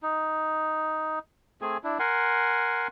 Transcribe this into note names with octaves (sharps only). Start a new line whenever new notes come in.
D#4
A3 C4 G#4 G#5
D4 E4
A#4 F#5 G#5 C6